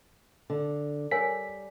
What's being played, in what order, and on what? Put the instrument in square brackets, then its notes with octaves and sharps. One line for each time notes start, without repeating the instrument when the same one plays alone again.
[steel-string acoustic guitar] D3
[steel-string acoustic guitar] G3 [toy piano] A#4 C#5 G#5 [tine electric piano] B6